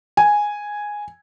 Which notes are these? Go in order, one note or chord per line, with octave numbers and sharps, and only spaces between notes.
G#5